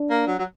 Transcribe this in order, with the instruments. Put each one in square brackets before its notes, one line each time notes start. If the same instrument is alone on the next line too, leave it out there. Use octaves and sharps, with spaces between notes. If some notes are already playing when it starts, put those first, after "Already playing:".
Already playing: [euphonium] D4
[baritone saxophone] A#3
F#3
F#3